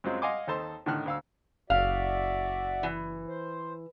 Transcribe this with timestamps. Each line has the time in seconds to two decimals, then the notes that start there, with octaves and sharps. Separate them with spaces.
0.04 F#2 F#3 G#3 C4 F4
0.22 D#5 F5 F#5 G#5 C6 D6
0.47 D#2 D#4 A4 C5 A5 C6
0.86 A2 D3 D#3 F6 F#6
1.06 D2 F5 E6
1.70 F#1 F#4 D5 E5 F5
2.83 E3
3.28 C5